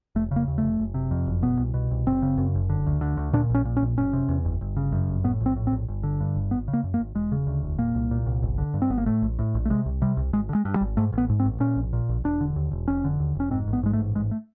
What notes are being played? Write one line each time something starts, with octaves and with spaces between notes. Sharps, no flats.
F1 A3
C#3 A#3
D#2
A3
F1
F#1
C3
F2
F#1
B2 B3
C2
B2
C2
F#1 C4
C#3
F#2
F#1
D3
D2
D3
D2
A#2 D4
A#1
C#4
A#2
C#4
A#1
F#1 C#4
C3
E2
F#1
G1
C#3
F#2
G1
A2 B3
A#1
C4
A2
C4
A#1
G1
D3
G2
G1
G#1 B3
C#3
A#3
F#2
A#3
G#1
E1 G#3
C#3
D2
E1
A#2 A#3
C2
A#2
C2
G1
D3
G2
C4
G1 B3
A#3
A2 A3
A#1
A2
A#1
A3
C3 G#3
C2
C3 G3
C2
G#1 G#3
D3
G#3
G2
G3
G#1
G#2 A3
A1
B3
G#2
C4
A1
A#2 C#4
A#1
A#2
A#1
E1 D4
D3
D#2
E1
F1 C#4
D3
D#2
F1 C#4
G#2 C4
A1
B3
G#2 G#3
A3
A1
G#2 G#3
A3